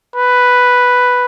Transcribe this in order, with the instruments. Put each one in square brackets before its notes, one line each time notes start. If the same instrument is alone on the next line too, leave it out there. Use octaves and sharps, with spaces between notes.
[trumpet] B4